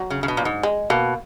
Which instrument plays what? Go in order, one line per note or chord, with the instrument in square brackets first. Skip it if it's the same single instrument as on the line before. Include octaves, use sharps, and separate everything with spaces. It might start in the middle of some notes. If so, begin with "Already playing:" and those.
Already playing: [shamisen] F#3
[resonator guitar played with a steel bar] C#3
C#3
B2
A#2
G#2
[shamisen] G#3
[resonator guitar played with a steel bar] B2 [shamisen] A#3